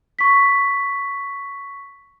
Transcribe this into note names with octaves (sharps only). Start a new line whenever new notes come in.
C#6 B6